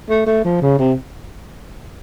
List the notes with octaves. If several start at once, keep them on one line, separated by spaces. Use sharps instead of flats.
A3
A3
F3
C#3
C3